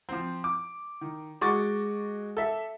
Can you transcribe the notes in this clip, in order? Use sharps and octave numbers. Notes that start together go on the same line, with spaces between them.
F3 C4
D6
D#3
G#3 F#4 C#6 D6 A6
A4 E5